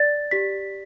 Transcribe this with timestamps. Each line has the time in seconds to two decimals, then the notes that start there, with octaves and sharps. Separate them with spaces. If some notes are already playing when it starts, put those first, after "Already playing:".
Already playing: D5 A6
0.31 G4 B6